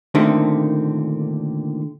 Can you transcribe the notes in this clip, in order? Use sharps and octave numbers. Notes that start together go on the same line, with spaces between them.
A#2 D3 D#3 A3 A#3 C4